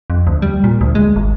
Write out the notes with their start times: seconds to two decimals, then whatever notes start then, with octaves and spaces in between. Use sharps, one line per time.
0.10 F2
0.27 D2
0.42 G3
0.64 A#2
0.81 D2
0.95 G#3
1.16 G#1